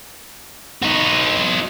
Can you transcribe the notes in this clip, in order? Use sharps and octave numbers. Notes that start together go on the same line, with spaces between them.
D#4 F#4